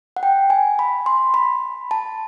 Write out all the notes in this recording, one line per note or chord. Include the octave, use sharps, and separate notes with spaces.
F#5
G5
G#5
B5
C6
B5
A5